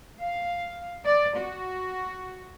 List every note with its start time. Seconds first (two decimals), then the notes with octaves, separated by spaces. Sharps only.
0.20 F5
1.05 D5
1.36 F#4